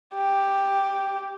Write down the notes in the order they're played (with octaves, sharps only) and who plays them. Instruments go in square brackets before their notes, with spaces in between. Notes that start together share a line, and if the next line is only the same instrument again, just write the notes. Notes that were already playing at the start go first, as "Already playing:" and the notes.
[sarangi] G4